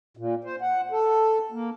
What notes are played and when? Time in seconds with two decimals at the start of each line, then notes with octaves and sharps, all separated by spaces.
0.17 A#2
0.44 C5
0.61 F#5
0.91 A4
1.52 A#3